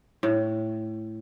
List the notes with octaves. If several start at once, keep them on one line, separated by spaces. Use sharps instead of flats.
A2